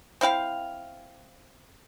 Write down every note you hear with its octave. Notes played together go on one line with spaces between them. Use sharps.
C4 E4 F5 G5